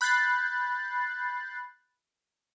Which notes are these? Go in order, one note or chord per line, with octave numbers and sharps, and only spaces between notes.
B5 F#6 G6 A6 C7